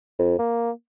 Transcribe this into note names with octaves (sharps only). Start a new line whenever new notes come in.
F2
A#3